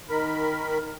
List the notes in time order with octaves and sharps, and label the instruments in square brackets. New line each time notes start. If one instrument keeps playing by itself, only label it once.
[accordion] D#3 A#4 B5